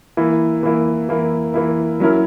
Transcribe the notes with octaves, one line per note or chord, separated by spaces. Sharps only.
E3 A#3 E4
E3 A#3 E4
E3 A#3 E4
E3 A#3 E4
F#3 C#4 E4 A#4